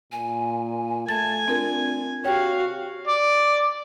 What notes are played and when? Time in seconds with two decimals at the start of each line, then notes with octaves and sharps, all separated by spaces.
0.12 A#2 G#5
1.09 A3 G#5 A5 A6
1.48 C4 D4 F4 A#4 G#6
2.25 C3 F#4 G4 C#5 F5 G5
3.07 D5